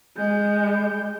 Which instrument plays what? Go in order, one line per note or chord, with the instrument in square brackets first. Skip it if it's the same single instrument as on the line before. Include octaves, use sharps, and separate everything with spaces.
[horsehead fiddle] G#3 [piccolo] G6